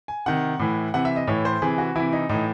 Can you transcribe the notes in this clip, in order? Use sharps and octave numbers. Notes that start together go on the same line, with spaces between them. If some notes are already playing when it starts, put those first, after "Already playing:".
G#5
C3 D#3 F#5
A2 E3
C3 E3 F#5
E5
D#5
A2 E3 C#5
C5
C3 E3 G#4
F#4
C3 E3 E4
D#4
A2 E3 D#4